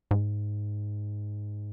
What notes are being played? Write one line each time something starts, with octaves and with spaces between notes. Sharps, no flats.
G#2